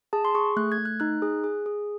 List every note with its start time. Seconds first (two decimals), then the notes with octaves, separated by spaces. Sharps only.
0.13 G#4 A5
0.25 C6
0.35 G#4 C#6
0.56 A3 F#6
0.72 G#6
0.78 A3
0.85 F#6
1.00 D#4 F#6
1.22 G#4
1.44 G#4
1.66 G#4